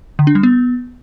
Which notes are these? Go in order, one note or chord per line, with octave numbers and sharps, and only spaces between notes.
D3
D4
G3
B3